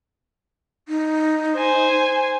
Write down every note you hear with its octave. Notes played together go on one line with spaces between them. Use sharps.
D#4
C5 G#5